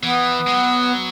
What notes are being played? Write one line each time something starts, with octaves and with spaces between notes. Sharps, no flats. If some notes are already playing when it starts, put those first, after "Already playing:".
E3 B3
G#3
F#3